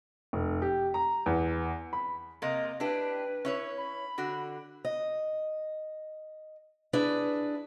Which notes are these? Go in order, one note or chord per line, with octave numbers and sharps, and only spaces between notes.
F1
G4
A#5
E2
B5
C3 A#3 D#5
D4 E4 G4 B4
C#4 E4 C#5
B5
D3 F#4
D#5
D4 E4 G#4 B4